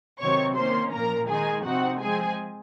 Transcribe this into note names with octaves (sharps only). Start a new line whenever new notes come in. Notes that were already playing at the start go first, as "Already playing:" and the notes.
C3 D#3 F#3 C4 C#5 C#6
D#3 A#3 C#4 C5 C6
A#2 F3 A#3 A#4 A#5
D#3 G#3 D#4 G#4 G#5
C3 F3 C4 D#4 F#4 F#5
F3 G#3 C4 G#4 G#5